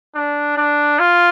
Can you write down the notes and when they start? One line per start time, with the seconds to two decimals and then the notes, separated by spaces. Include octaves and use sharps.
0.15 D4
0.57 D4
1.00 F4